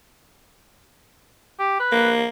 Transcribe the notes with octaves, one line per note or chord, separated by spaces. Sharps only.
G4
B4
A#3